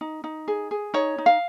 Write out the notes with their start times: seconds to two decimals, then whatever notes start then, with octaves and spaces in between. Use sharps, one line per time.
0.01 D#4
0.24 D#4
0.48 G#4
0.71 G#4
0.94 D#4 C#5
1.18 D#4
1.26 F5